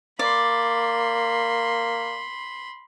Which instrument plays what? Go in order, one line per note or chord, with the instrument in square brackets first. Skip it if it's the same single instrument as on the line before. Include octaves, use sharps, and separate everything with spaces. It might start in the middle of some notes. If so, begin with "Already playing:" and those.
[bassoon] A#3 [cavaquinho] D5 [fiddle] B5 C6